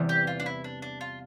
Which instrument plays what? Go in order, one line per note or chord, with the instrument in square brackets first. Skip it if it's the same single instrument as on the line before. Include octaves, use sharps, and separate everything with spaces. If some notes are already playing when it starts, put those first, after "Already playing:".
Already playing: [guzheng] E2 C3 E3 G3
[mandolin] G4
F4
D4
E4
D4
D4
F4